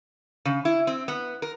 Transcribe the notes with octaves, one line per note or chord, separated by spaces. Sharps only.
C#3
E4
C4
B3
A#4